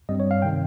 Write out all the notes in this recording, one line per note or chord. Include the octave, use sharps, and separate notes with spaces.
G2 G3 C4 D#5
C#5
F5
C3 D#3 G5